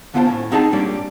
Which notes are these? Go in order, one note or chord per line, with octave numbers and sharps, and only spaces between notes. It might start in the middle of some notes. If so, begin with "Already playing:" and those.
D3 B3 F4 C5 A5
A2 C#4
C4 D#4 G#4 D#5 F#5 A5
G2 A#2 G3 C#4 D4